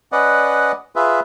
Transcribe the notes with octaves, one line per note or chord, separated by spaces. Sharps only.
C#4 B4 D5 D#5 F#5
F4 G#4 B4 E5